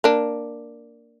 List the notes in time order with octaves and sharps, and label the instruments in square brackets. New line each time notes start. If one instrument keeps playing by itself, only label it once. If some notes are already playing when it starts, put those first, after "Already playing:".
[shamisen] A#3 D4